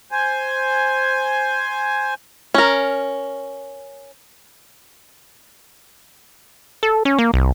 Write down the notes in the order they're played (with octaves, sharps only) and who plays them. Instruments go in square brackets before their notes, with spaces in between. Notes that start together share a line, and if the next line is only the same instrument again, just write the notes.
[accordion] C5 G#5
[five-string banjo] C#4 A#4
[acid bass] A4
C#4
A#3
C2